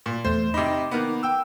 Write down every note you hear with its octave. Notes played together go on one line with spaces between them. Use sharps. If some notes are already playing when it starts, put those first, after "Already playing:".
A#2
E2 A3 C5
C3 D#4 B5 D6
D#3 A#3 B3
G5 E6